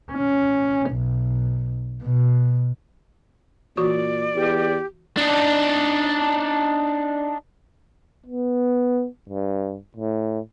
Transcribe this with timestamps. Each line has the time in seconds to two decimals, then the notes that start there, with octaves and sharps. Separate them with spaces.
0.12 C#4
0.90 B1
2.02 B2
3.77 A#2 E3 F#4 D5 C#6
4.35 E2 G4
5.17 D4 D#4
8.26 B3
9.29 G2
9.97 A2